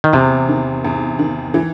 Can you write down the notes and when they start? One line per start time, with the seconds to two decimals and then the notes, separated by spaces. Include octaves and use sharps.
0.04 D#3
0.13 E2 C3
0.49 D#3
0.85 E2
1.19 D#3
1.54 E3